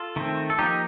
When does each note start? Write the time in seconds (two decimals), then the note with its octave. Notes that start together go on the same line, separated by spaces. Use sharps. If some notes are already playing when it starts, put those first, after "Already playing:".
Already playing: F4 A4
0.16 D#3 A3 C4
0.50 A4
0.58 F3 A#3 D#4 G4